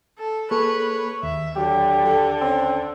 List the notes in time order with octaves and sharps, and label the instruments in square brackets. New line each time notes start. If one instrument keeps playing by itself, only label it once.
[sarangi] A4
[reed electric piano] A#3 G#4 A4 [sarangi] B4 [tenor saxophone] C#5
[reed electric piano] D#2 [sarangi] E5
[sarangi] D3 [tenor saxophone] F#3 [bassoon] G4
[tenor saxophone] A4
[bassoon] C4 [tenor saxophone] C#4